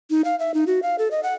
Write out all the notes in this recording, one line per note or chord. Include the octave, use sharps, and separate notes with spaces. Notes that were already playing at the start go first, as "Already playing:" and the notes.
D#4
F5
E5
D#4
F#4
F5
A4
D#5
F#5